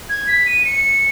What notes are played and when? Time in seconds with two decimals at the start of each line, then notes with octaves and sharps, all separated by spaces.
0.09 G#6
0.27 B6
0.46 D#7
0.65 C#7